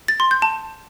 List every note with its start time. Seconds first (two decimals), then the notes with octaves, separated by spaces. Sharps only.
0.08 A6
0.20 C6
0.31 G6
0.42 A5